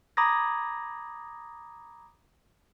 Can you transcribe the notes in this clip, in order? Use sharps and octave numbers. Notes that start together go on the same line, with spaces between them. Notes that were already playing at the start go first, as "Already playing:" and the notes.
A#5 B5 D6 D#6 G#6 A#6